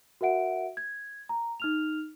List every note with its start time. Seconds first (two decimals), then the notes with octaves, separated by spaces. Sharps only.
0.21 F#4 A#4 E5 F#5 D7
0.77 G#6
1.29 A#5
1.60 D#4 F6 F7